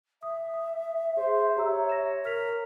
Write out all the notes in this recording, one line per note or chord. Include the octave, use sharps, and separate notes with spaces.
E5 D#6
D#6
G#4 C5
G4 C#5 A#5 E6
A#6 E7
A#4 F6 B6 F7